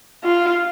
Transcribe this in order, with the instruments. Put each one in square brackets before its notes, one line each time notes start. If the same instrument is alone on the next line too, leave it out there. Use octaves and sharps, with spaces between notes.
[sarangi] F4